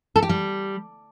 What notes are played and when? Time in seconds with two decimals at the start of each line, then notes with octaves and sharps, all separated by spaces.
0.16 A4
0.22 G4
0.29 G3